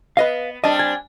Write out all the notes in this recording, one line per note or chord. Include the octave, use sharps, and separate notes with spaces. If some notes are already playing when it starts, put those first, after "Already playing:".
B3 B4 D#5 F5
G3 C4 D4 D#5 A5
G#5